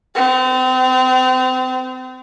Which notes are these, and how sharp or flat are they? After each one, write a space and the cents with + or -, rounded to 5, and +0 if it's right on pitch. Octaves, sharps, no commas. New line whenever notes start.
C4 -35